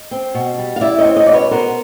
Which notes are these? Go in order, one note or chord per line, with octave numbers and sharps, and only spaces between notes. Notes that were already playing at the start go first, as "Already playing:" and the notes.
Already playing: D#5
C4
B2
G3
F5
E4 D5 E5
C#5 D#5
C4
C#5 D#5
B2 D5
B4 C#5
B3 A#4 C5